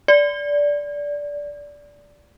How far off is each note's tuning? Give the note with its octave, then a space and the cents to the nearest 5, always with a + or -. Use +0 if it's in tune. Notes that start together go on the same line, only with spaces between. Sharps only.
D5 -15